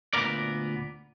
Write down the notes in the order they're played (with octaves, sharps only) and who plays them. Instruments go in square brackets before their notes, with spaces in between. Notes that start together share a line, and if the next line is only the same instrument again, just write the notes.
[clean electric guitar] D2 A#2 B3 A#4 D5